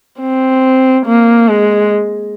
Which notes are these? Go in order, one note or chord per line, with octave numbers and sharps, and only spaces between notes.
C4
A#3
G#3